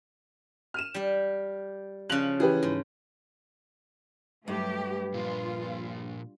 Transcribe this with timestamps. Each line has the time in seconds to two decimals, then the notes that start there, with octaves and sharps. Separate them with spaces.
0.74 F6 D#7 E7
0.94 G3 G4
2.09 C#3 F3 F#6 F7 F#7
2.40 E3 G4 G#4 B4
2.63 G#2
4.48 G2 F#3 A3 G4 B4
5.14 A#2 F3 F4